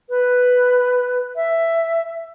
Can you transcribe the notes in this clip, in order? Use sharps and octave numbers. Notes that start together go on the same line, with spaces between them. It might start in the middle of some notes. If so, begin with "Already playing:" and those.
B4
E5